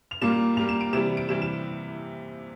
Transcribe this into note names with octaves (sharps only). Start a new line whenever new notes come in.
F7
A#2 G3 A#3 E7
A#2 G3 A#3 F7
E7
D7
C3 E3 G3 E7
D7
C3 E3 G3 E7
E7